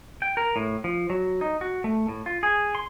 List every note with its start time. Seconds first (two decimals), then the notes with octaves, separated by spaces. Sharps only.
0.22 G5
0.37 A#4
0.56 A2
0.84 F3
1.10 F#3
1.41 D#4
1.61 F#4
1.84 A3
2.08 A2
2.26 F4
2.43 G#4
2.75 C6